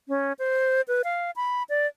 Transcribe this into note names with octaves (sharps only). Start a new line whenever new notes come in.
C#4
C5
B4
F5
B5
D5